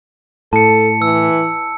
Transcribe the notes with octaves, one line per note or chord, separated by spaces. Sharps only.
A2 A4 A5 C#7
E3 E6